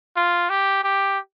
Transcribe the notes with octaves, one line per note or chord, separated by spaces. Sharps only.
F4
G4
G4